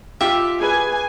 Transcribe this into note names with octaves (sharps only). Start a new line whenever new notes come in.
F4 G4 E5
G#4 B4 G#5